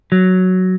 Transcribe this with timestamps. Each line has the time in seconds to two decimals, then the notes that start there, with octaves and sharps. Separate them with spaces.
0.12 F#3